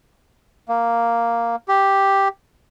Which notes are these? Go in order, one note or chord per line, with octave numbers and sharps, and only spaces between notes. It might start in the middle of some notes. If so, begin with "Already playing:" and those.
A#3
G4